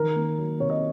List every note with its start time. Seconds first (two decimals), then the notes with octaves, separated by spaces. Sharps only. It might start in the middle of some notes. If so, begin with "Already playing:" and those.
Already playing: D#3 A#4
0.16 A#3
0.38 F#3
0.60 C3 C#5
0.70 D#5